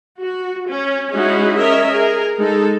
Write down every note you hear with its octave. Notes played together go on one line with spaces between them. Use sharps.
F#4
C#4
G#3 C#4 D#4 E4 F#4 G#4
C#4 A#4 C#5 D#5 E5
G#4 A#4
G#3 D#4 A4